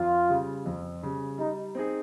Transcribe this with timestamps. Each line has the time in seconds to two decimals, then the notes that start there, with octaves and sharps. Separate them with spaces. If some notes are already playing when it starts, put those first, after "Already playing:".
Already playing: F2 F4
0.30 C#3 G3
0.66 F2
1.02 C#3 G3
1.38 G3 D#4
1.75 C4 D#4 G#4